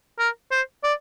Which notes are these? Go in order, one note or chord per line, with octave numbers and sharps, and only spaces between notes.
A#4
C5
D5